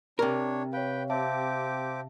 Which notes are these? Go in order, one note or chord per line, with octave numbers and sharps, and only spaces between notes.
C3 D4 A#4 C#5
B4 C#5 F5 G5
C4 G4 E5 F5 A5 D6